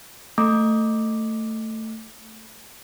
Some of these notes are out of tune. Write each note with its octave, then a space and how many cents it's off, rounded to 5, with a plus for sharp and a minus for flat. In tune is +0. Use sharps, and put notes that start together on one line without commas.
A3 +15 D6 +0